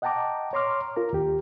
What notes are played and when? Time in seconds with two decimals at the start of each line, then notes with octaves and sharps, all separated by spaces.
0.02 D#5 F#5 G5 A5 A#5 D6
0.53 C#5 A#5 C6 D6 F6
0.96 F4 A#4 A#5
1.13 D#2 G4